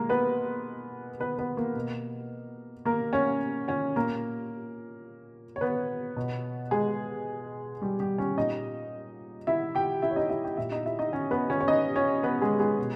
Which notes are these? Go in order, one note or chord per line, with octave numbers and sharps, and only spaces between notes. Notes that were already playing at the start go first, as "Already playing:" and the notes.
Already playing: B2 G#3 A#3 A#4
B3 B4
B3 B4
B3 B4
A#3 A#4
B2
A#3 A#4
C#4 C#5
C#4 C#5
A#2 A#3 A#4
C#5
B3 B4
B2
G#3 G#4
G3 G4
G3 G4
C#4 C#5
A#2 D#4 D#5
E4 E5
G4 G5
E4 E5
C#5
D#4 D#5
E4 E5
G4 G5
A#2 E4 E5
D#4 D#5
E4 E5
D#4 D#5
C#4 C#5
B3 B4
C#4 C#5
C#5
D#4 D#5
C#4 C#5
B3 B4
G#3 G#4
G#3 G#4
B2